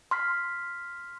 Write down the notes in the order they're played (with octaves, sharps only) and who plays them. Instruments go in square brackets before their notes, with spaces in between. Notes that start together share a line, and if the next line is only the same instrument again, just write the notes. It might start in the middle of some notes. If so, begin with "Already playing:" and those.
[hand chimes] C6 F6 B6